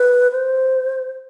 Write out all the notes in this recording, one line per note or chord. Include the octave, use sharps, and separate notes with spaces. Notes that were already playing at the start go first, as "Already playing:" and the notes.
Already playing: B4
C5